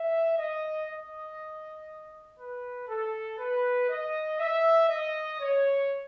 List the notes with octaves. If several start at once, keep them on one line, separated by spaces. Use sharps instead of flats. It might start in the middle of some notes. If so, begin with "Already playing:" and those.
Already playing: E5
D#5
D#5
B4
A4
B4
D#5
E5
D#5
C#5